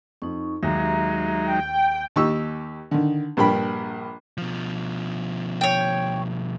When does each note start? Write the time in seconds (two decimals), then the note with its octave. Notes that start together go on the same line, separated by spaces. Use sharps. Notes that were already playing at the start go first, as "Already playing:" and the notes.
0.22 F2 D#4 C#6
0.63 D#2 D#3 F#3 G#3 D#4 G4 E5 A#5
1.48 G5
2.16 D#2 D#4 G4 C#6 E6
2.91 D3 D#3
3.37 A#1 G2 A#4 G5 B5
4.38 B2 F3
5.61 C#5 G5